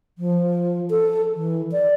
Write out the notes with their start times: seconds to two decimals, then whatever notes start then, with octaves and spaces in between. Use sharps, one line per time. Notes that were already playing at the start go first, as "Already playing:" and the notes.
0.18 F3
0.90 A4
1.36 E3
1.72 D5